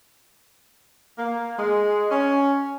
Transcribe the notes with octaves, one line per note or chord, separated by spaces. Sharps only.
A#3
G#3
C#4